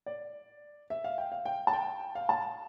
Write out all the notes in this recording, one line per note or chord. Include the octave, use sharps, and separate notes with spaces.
D5
E5
F5
G5
F5
G5
A5
G5
F5
A5